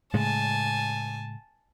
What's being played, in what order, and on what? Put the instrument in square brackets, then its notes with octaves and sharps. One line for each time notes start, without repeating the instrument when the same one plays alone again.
[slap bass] A2 C#3 G#3 [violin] G#5 A5